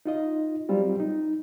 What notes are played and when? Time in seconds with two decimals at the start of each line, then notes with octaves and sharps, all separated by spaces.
0.06 D#4 F4 D#5
0.69 F#3 G3 C4 F4
1.00 D#4